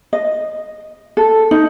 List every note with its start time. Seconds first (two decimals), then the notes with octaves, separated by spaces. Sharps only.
0.13 D#5
1.17 A4
1.51 D#4